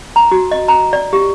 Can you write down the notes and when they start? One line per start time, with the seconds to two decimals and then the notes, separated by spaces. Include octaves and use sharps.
0.16 A#5
0.32 F#4
0.51 D#5
0.68 A#5
0.93 D5
1.13 G4